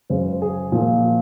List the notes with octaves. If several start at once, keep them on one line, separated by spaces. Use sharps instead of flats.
F#2 C#3 G#3 C5
C5
G#4
A#2 F3 A#3